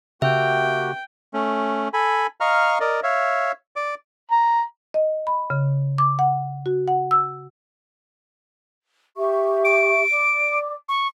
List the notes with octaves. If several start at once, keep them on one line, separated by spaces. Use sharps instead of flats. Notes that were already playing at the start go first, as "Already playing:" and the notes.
C#3 A#3 F#4 G4 E5 G5
A3 C#4
A4 G#5 B5
D#5 F5 A#5 C#6 F6
A#4 D5 D#5
C#5 E5 F5
D5 D6
A#5
D#5
B5
C#3
D6
F#5
F#4
F#5
E6
G4 E5 C#6
D7
D5 D6
C#6